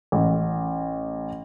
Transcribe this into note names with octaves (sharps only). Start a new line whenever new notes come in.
A1